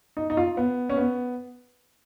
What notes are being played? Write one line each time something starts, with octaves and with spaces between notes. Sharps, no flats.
D#4
D#4
F4
B3
C#4
B3